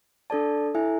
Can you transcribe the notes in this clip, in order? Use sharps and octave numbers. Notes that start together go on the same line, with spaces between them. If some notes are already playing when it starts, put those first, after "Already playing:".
D4 A4 D5 A5
E4 A4 E5 G#5